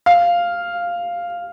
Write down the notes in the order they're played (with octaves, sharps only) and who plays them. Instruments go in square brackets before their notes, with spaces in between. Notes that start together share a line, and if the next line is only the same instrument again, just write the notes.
[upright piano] F5